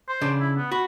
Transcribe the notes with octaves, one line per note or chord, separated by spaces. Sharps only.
C5
C#3 D4
E4
B3
F#4 B5